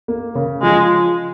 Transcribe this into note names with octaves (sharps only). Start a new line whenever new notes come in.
A#3
C#3
F3 G#3